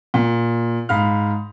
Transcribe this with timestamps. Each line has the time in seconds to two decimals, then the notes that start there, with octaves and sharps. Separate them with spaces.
0.14 A#2
0.89 G#2 F5 B5 F6